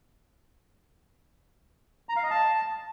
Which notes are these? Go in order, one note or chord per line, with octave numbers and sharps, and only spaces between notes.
A#5
F5
D#5
A5